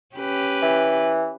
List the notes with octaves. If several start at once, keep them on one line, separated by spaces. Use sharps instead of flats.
C#4 G4 B4
E3